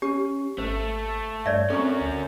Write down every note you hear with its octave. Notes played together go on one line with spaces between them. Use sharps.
C#4 G4
G#1 A3 C5
G2 C#5 D5 E5
F#3 C4 C#4 A4 C#6
D2